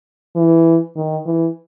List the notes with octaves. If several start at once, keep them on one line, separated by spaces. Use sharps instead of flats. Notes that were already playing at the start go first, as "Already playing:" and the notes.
E3
D#3
E3